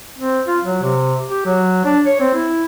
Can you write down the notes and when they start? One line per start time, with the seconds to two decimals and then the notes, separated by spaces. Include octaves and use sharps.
0.18 C4
0.47 F4
0.65 F#3
0.83 C3
1.29 G4
1.46 F#3
1.85 D4
2.05 C#5
2.20 C4
2.34 E4